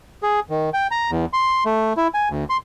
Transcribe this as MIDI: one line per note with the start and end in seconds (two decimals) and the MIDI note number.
0.23 0.40 68
0.50 0.70 51
0.74 0.87 79
0.91 1.11 82
1.11 1.25 40
1.33 1.64 84
1.66 1.93 57
1.97 2.07 64
2.14 2.29 80
2.30 2.44 38
2.50 2.57 84